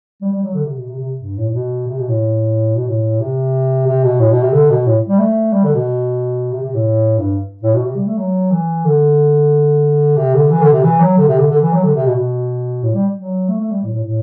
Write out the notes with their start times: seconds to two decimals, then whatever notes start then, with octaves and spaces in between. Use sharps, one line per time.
0.21 G3
0.33 G3
0.43 F#3
0.54 D3
0.65 C3
0.77 B2
0.88 C3
0.99 C3
1.21 G2
1.37 A2
1.49 A2
1.54 B2
1.87 C3
1.98 B2
2.09 A2
2.76 B2
2.87 A2
3.20 C3
3.87 C3
4.03 B2
4.19 A2
4.31 B2
4.42 C3
4.52 D3
4.70 B2
4.86 A2
5.08 G3
5.19 A3
5.53 G3
5.64 D3
5.74 B2
6.52 C3
6.63 C3
6.74 A2
7.18 G2
7.63 A2
7.74 B2
7.85 C3
7.96 G3
8.07 A3
8.18 F#3
8.51 E3
8.85 D3
10.17 C3
10.35 D3
10.51 E3
10.61 D3
10.72 C3
10.83 E3
11.00 F#3
11.17 D3
11.28 C3
11.38 D3
11.50 D3
11.61 E3
11.73 F#3
11.84 D3
11.95 C3
12.06 B2
12.16 B2
12.83 A2
12.94 G3
13.17 F#3
13.49 A3
13.61 A3
13.71 G3
13.83 A2
13.93 A2
14.04 A2